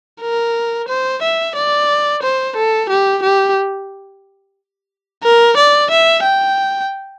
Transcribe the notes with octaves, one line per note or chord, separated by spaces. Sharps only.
A#4
C5
E5
D5
C5
A4
G4
G4
A#4
D5
E5
G5